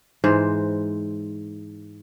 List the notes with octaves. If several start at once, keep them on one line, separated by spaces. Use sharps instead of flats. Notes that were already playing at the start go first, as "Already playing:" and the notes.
G#2 E3 C5